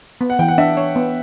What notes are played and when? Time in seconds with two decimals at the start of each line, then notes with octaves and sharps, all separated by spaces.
0.21 B3
0.30 F#5
0.39 E3 G5
0.48 F#5
0.58 D4 E5
0.77 C#5
0.96 B3